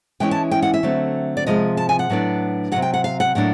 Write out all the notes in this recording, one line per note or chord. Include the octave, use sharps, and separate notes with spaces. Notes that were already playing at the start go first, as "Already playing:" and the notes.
E3 G#3 C#4 E4 G5
A5
G5
F#5
E5
D3 F#3 A3 C4
D5
C3 F3 G#3 D#5
A5
G#5
F#5
A2 F#3 B3 D4
C3 D#3 F#3 F#5
G5
F#5
F5
F#5
A2 F#3 A#3 D4 F#5